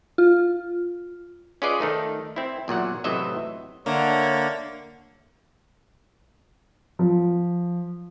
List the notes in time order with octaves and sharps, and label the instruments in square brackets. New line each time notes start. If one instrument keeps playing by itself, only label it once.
[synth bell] F4
[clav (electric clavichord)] C#4 F4 G#4 B4 D5 D#5
D#3 A3 D#4 A4
C4 E4
E2 A#2 F#3 F#5
A2 C3 E3 F#3 D#5 E5
[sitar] D3 [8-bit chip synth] A#3 [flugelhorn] C#5 [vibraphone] E5 F#5
[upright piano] F3